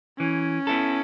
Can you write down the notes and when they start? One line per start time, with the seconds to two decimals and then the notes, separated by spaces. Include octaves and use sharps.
0.19 E3 C#4
0.67 B3 E4 A4